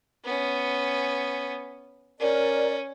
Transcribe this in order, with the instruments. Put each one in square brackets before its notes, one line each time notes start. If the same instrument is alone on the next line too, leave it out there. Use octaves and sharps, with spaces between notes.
[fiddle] B3 C#4
[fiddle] C#4 [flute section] A#4 D5